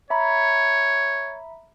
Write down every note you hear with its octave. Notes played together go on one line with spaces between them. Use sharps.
C#5 E5 A#5 B5